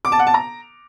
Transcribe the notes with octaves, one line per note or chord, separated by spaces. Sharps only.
D6
A5
F#5
A5
A#5